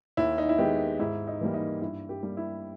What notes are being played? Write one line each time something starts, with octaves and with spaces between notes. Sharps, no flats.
D#2 E4
D#4
E4
D#3 G#3 B3 G4
G#2 E4
D#4
E3 G3 A#3
D#4
G2 E4
G4
G3 A#3
E4